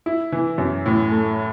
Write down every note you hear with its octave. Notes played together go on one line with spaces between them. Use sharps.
E4
E3
F#2
A2
A3